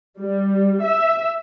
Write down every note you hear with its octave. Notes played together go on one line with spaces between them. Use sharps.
G3
E5